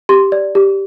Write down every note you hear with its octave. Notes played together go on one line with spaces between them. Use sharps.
G4 C6
D5
G4